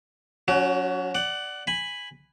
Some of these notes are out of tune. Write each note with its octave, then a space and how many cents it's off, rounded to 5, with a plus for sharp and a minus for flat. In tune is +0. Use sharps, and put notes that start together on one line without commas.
F#3 -20 C#4 +25 F#4 +30
D5 +0 F#5 +20
G#5 -10 B5 +0